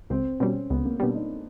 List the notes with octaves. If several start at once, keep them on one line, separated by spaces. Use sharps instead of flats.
C#2 C4
B2 G3 C#4
C#2 B3
A#3
B2 G3 D4
D#4